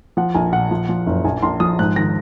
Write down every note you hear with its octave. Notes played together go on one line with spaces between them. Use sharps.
F3 F#5
A#1 G#5
A#2 F#5
F3
F3
F#1
A#1 G#5
A#1 C6
F3 D#6
G#2 F#6
D#3 A#6